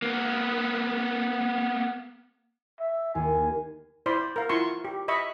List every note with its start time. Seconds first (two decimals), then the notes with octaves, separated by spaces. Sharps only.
0.02 A#3 B3
2.80 E5
3.15 D#2 G#5
4.06 E4 C5 D5 B5 C6
4.36 A#4 F5
4.49 E4 F4 C6 C#6
4.85 G4
5.08 D#5 E5 B5 C#6